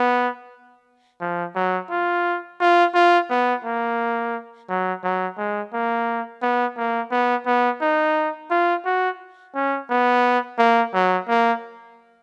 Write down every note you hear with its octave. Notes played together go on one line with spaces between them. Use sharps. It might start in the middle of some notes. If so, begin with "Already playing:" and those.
Already playing: B3
F3
F#3
F4
F4
F4
B3
A#3
F#3
F#3
G#3
A#3
B3
A#3
B3
B3
D#4
F4
F#4
C#4
B3
A#3
F#3
A#3